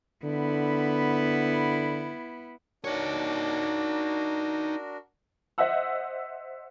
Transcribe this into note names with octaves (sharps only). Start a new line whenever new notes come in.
D3 B3 E4
D4 D#4 F#4 A#4 C#5
C5 D#5 E5 F#5 E6